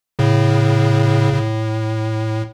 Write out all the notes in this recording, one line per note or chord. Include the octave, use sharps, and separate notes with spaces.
A2 C#3
A2